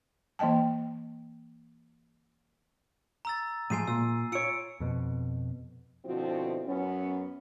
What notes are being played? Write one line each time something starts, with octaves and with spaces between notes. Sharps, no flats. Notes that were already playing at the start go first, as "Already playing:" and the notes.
E3 A#3 D#5 G5 A5
A#5 E6 A6
A2 F3 G#3 G#5 C7 D#7
A#2 E6
F4 C#5 E6 C#7 D7
F2 B2
B2 D3 F3 C4 E4 F#4
F#2 F#3 B3 C#4